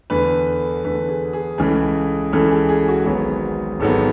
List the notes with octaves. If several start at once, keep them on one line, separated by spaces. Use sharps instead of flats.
E2 D3 A3 B4
E2 D3 A3 B4
G#4
G#4
C#2 C#3 E3 A3 G#4
C#2 C#3 E3 A3 A4
G#4
G#4
F#4
G#1 G#2 F#3 B3 G#4
G#1 G#2 F#3 B3 A4